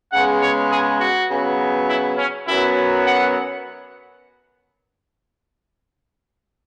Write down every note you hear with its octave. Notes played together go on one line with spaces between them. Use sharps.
C#3 G#3 B3 F#5
C#5
G#4
F#4
C#3 F#3 B3
E4
C#4
F#2 F#3 B3 E4
F#5